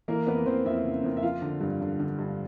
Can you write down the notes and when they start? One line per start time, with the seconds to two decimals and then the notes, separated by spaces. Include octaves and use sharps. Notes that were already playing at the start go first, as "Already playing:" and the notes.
0.08 E3 A#3 A#4
0.27 F2 B3 B4
0.46 E3 C4 C5
0.65 F2 E4 E5
0.84 C#3
1.04 F2
1.17 E5
1.23 F3 F4 F5
1.42 D3
1.61 G2
1.81 D3
1.99 D3
2.19 G2